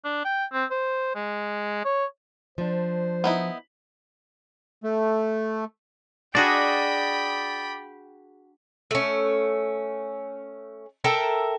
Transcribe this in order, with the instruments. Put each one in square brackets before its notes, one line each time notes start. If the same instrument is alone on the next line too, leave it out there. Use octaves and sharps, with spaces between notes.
[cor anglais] D4
G5
C4
C5
G#3
C#5
[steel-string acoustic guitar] F3 D4 [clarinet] C5
[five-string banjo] B3 D#4 E4
[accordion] A3
[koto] D4 F#4 G#4 [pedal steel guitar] D5 D#5 [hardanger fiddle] G5 B5
[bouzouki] A3 C#4
A4 A#4 E5 G5